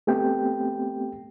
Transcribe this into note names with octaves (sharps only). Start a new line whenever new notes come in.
A3 B3 C4 G4 A4 G5